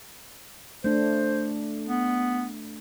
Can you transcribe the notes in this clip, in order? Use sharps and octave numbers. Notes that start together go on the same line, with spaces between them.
A3 D4 C5
B3